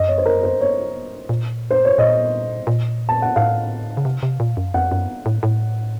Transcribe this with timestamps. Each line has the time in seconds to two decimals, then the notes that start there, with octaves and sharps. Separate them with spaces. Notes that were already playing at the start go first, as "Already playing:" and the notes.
Already playing: F#2 D#5
0.08 C#5
0.18 C5
0.26 A#4
0.43 C5
0.61 C#5
1.29 A#2
1.71 C5
1.85 C#5
1.98 A#2 D#5
2.67 A#2
3.09 A5
3.22 F#5
3.36 A2 F5
3.97 C#3
4.05 C3
4.23 C3
4.40 A#2
4.57 F#2
4.74 F2 F#5
4.91 F#2
5.26 A2
5.43 A2